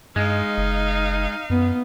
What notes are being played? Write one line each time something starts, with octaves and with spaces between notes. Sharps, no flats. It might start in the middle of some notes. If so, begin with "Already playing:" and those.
G2 G#3 D#4 F5
F#1
F#2 B3